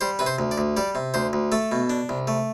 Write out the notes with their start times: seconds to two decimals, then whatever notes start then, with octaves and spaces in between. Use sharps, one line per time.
0.01 G3 C5
0.19 C3 B4
0.26 C5
0.39 D2
0.51 D5
0.58 D2
0.77 G3 D5
0.95 C3
1.14 D2 C5
1.33 D2
1.52 A3 A4
1.72 B2
1.90 D4
2.09 C2
2.28 A3